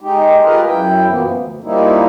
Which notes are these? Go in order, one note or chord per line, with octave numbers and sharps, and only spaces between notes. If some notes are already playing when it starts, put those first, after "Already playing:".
G#3 D#4 G4
F4 G4 G#4 A#4 B4 D#5
F#2 E4 G5
F#2 B2 E3 F3 A#3 B3
D2
F3 G3 A#3 D#4 E4